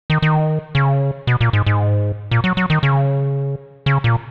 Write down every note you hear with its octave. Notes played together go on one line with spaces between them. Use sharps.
D#3
D#3
C#3
B2
A#2
G#2
G#2
A#2
F#3
F#3
D#3
C#3
C#3
A#2